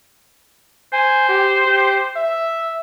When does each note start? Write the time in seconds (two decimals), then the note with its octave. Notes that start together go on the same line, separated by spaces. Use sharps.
0.93 C5 G#5
1.29 G4
1.66 G4
2.16 E5